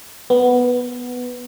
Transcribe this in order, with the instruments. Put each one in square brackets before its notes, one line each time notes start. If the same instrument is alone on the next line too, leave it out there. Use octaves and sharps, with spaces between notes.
[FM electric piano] B3